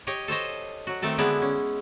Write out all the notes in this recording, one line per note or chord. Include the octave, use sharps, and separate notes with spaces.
G4 C#5 D#5
A4 C5 C#5 D#5
F#3 F#4
D#3 A3 C4 A4
D3 G#3 B3 D4 E4
C#4